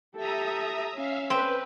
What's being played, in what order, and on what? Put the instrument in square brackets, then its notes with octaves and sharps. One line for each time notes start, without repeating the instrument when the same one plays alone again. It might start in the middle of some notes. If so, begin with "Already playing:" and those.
[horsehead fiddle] G4 A4 [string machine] E5 A#5 D#6
[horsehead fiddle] C#4 [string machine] E5 F5
[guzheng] C4 [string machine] B4